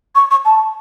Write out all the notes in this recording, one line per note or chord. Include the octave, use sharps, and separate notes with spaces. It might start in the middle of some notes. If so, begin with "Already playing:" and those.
C#6
C#6
A5